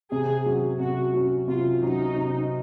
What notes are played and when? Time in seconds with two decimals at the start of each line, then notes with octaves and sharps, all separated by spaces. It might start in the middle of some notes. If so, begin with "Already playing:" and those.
0.11 C3 G#4
0.46 F#3 C#4
0.79 C3 F#4
1.13 F#3 C#4
1.48 C3 F4
1.81 F#3 C#4 D#4
2.16 C3